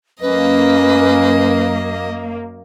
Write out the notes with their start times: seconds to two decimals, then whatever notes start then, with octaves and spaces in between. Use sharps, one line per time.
0.21 F#2 A#3 C#4 B4 D#5